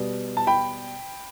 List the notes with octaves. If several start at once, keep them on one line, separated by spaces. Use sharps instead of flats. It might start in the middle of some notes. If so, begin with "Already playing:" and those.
Already playing: B2 G3 B3
A5
G5 B5